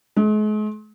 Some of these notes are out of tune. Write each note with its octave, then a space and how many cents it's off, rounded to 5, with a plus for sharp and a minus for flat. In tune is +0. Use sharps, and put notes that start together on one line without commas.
G#3 +40